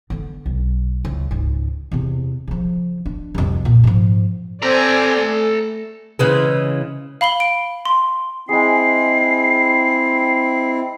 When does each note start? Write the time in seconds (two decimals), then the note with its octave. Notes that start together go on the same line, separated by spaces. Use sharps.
0.10 D3 B3
0.46 B1
1.05 C#2
1.31 C#2 G#2
1.92 E2 C3
2.48 C#3 F3
3.06 D4
3.35 C2 F2
3.65 A#2
3.84 G#2 F3
4.62 C4 A4 D5 G#5 A#5
5.20 A3
6.19 C#3 E3 G#3
7.21 F5 B5 F#7 G7
7.40 D7
7.85 C6
8.49 G#3 C4 E4 G#4 C7